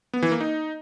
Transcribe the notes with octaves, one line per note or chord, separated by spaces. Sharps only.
B3
E3
A#3
D#4